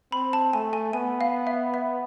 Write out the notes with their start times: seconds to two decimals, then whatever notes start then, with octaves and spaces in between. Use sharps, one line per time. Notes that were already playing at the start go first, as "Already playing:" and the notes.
0.12 C4 B5
0.33 A5
0.53 A3 G#5
0.73 G#5
0.93 B3 G#5
1.21 F5
1.47 E5
1.74 E5